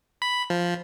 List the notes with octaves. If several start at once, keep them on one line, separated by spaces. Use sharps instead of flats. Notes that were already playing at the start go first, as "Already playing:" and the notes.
B5
F3